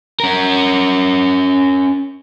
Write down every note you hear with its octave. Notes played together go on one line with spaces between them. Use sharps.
C#4 A#4